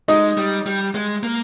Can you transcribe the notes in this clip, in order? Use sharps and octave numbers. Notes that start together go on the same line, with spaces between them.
G#3 D#4 D#5
G3
G3
G#3
A#3